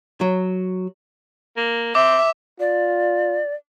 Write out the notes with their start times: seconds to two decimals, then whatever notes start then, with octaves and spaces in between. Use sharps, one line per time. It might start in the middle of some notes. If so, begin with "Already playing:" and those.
0.21 F#3
1.57 A#3
1.95 C4 E5 D6
2.60 F4 D5